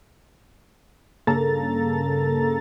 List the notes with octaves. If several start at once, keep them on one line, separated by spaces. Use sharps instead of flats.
G2 C#3 A#3 A4 A#5 A6